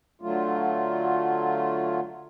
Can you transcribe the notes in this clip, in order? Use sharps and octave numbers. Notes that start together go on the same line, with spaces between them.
D3 F#3 A3 F4